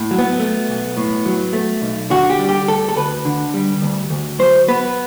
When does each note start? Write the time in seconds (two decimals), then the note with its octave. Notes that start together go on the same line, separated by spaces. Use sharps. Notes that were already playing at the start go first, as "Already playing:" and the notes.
Already playing: A2
0.11 F#3
0.18 B3
0.40 A3
0.69 B1
0.97 A2
1.26 F#3
1.53 A3
1.82 B1
2.10 D3 F#4
2.30 G4
2.39 G3
2.49 G4
2.68 D2 A4
2.89 A4
2.96 D2 B4
3.25 D3
3.54 G3
3.82 D2
4.10 D2
4.39 F#3 C5
4.68 B3 B4